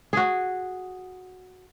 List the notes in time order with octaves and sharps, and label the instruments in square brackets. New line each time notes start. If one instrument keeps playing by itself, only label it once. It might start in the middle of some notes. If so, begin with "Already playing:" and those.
[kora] F#4 G#4